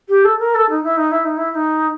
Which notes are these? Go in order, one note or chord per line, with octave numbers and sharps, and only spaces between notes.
G4
A4
A#4
A4
D#4
E4
D#4
E4
D#4
E4
E4
D#4